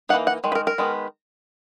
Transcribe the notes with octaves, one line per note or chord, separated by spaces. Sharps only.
E3 A#3 D#4 F#5
F#5
D#3 G#3
B4
A#4
A#4
D#3 G#3 B3